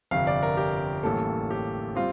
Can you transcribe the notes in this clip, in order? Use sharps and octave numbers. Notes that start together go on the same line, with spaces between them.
G1 F2 C3 F5
D5
A#4
G4
A1 A2 G3 A#3 A4
G4
G3 C4 F4